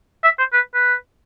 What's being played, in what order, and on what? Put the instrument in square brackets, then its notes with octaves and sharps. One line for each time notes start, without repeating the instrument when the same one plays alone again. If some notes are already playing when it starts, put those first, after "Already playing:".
[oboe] E5
C5
B4
B4